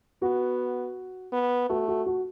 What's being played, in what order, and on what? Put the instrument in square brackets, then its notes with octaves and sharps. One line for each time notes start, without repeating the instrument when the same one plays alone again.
[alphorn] B3 [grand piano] F#4
[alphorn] B3
[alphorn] A3 [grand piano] F#4
[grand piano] F#4
F#4